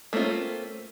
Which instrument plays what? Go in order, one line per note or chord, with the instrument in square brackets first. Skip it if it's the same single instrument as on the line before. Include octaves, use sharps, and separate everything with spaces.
[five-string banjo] A3 A#3 C4 C#4 F4